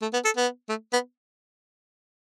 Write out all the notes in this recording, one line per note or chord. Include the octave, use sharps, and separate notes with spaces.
A3
B3
A4
B3
A3
B3